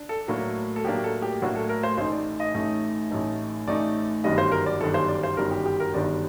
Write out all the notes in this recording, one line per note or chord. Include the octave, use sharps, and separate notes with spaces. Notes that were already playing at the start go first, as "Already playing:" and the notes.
Already playing: D4
A4
A2 F#3 A#3 D4
A4
A2 F#3 A#3 D4 G4
A4
G4
A2 F#3 A#3 D4 F#4
A4
A#4
C5
A1 A2 A3 D#4 C5
D5
D#5
A1 A2 A3 D#4
A1 A2 A3 D#4
A1 A2 A3 D#4 D5
G1 F#2 D#3 G3 D4 D#5
C5
A#4
D5
G1 F#2 D#3 G3 D4 A4
C5
D5
C5
G1 F#2 D#3 G3 D4 A#4
G4
G4
A#4
G1 F#2 D#3 G3 D4 D5